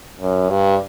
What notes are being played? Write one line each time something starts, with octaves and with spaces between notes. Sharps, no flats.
F#2
G2